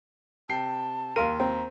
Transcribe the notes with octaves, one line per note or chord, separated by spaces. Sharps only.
C3 G5 A5 C7
D#2 A#4 F5 C6 D#7
C4 A#5